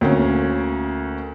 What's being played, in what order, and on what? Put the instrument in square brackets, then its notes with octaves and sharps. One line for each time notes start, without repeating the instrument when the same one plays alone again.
[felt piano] D2 A#3 C#4